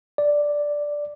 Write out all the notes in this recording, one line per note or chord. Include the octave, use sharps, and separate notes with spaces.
D5